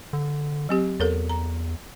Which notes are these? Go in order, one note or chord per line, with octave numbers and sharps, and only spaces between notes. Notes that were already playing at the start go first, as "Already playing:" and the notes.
D3
F#3 C4 G4
E2 A4 A#4 C#5
A#5